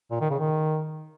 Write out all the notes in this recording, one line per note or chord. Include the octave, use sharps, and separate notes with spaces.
A#2
D#3
C#3
D#3